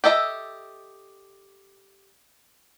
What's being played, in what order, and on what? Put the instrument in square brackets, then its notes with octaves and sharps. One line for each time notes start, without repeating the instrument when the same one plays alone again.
[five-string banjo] G4 A4 D#5 E5